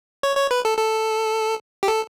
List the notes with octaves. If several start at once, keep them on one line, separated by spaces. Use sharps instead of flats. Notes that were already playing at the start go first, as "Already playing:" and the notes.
C#5
C#5
B4
A4
A4
G4
A4